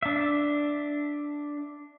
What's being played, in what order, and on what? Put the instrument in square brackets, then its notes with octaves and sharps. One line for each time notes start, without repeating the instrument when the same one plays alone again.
[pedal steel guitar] D4 E5